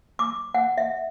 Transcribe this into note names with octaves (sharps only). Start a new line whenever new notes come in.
D6
F#5
E5